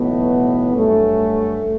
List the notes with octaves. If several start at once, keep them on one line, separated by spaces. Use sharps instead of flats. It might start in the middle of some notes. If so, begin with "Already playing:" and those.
Already playing: B1 A2 E3 B3
G2 F#3 A3 C#4